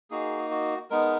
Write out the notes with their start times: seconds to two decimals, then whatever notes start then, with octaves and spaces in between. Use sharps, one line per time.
0.10 A#3 D#4 F#4 G#4
0.51 F#4
0.90 G#3 B3 D#4 A#4